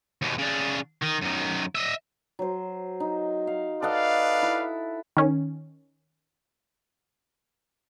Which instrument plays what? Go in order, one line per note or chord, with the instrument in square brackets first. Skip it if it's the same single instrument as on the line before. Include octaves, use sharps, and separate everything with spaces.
[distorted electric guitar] D#2 B2
C#3 D4
D#3
F#2 D#3
D#5 E5
[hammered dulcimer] F#3 C5
D#4
F5
[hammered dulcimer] A4 D#5 F#5 [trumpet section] B4 D5 F5
[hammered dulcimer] E4
[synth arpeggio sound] D#3 C#4